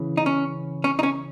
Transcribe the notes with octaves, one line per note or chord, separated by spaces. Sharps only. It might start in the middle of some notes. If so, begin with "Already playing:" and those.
Already playing: C#3 E3
D#4
C#4
C#4
D#4
C#4